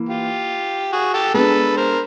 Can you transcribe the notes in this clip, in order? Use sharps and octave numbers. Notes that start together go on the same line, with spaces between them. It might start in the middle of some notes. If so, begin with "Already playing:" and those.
Already playing: E3 A#3
F4 G4
F#4 G#4
G4 A4
G#3 B3 D4 A4 B4
A#4 C5